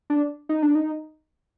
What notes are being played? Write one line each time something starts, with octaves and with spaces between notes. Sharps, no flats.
D4
D#4
D4
D#4